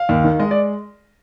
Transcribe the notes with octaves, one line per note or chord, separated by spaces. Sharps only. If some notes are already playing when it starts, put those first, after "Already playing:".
Already playing: F5
D#2
D#3
G#3 D#5
D5